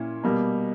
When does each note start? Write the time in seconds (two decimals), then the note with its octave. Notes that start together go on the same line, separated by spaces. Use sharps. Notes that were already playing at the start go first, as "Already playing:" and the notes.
Already playing: A#2 C#4 E4
0.24 B2 G3 A#3